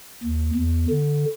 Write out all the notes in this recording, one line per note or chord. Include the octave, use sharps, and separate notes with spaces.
D#2
E2
D3